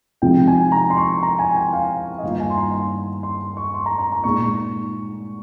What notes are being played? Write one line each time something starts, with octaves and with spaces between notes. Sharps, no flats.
C3 F3 G#3 C4 D#4 G5
G#5
A#5
C6
C#6
A#5
G#5
G5
F5
D#5
G2 D#3 A#3 F4 F5
G#5
C6
A#5
C6
C6
C#6
C6
A#5
A#5
A#5
A#2 G#3 D#4 C#6